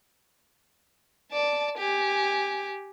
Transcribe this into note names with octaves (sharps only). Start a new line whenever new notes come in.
D5 A5
G4 G#5